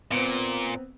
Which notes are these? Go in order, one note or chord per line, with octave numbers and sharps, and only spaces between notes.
A#2 B3 C4